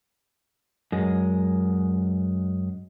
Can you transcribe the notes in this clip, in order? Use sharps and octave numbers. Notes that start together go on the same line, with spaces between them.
F#2 G#3